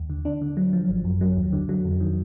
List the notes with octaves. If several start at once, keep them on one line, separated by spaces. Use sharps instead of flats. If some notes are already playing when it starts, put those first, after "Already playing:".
Already playing: D#2
D3
D4
D3
F#3
F3
G#1
F#2
F#3
D#2
D3
F#3
F2
D#3